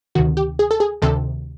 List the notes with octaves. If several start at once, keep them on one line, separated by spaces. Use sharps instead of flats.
D2 C3 D#3 F#4
G4
G#4
A4
G#4
D2 C3 D#3 A4